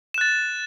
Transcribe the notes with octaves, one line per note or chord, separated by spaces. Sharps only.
F#6 A6 E7